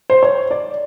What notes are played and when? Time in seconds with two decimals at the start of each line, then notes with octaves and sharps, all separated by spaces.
0.10 C5
0.23 C#5
0.51 D5